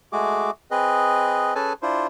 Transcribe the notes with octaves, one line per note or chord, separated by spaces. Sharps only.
G#3 A3 F#4 G#4 D6
C4 G#4 B4 D#5
C#4 G#4 A4 B4 G#5 A5
D4 E4 F4 C5